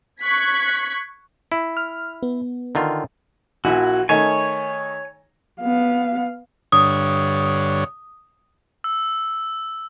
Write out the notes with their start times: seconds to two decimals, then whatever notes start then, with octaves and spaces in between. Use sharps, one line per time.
0.22 C#6 F#6 G#6 B6
1.52 E4
1.77 F6
2.23 B3
2.75 D3 D#3 F4
3.65 A#1 E4 F#4 G#5
4.09 D#3 A3 D#4 C#5 G#5
5.61 B3 F5
6.72 G2 D3 C#5 D#6
8.84 E6